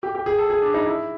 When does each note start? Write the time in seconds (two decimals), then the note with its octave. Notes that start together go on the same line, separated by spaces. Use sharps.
0.03 G4
0.15 G4
0.26 G#4
0.38 A4
0.50 G#4
0.62 D4
0.74 D#4
0.86 E4